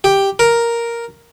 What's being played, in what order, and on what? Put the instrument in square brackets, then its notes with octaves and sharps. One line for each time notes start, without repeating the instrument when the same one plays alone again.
[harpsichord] G4
A#4